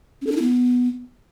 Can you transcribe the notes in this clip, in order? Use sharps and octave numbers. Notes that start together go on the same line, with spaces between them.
C#4
A4
D4
E4
B3